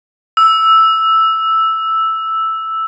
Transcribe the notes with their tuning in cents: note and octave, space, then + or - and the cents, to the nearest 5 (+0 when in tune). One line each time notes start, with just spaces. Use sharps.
E6 +0